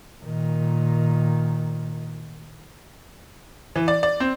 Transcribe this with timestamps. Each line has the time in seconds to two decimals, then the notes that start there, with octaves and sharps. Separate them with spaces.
0.24 A#2 D#3
3.76 E3
3.88 D5
4.03 D5
4.20 C4